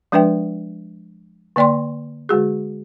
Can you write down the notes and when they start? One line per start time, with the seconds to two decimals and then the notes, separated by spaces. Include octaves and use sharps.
0.12 F3 G#3 D4 B4 E5 G5
1.56 D3 A#3 D5 G5 C6
2.29 D3 G#3 F#4 G#4